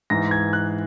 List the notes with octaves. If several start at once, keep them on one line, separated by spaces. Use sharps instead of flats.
G#2 E3 A#6
G#6
F#6